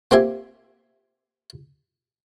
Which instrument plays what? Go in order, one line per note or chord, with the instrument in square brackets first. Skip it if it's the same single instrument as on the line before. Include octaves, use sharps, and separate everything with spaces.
[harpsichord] A#3 C4 F4 G4 E5 G#5